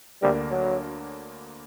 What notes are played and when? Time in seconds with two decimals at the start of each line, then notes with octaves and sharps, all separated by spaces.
0.22 D2 D3 G3 A#3 D4 A#4
0.51 F#3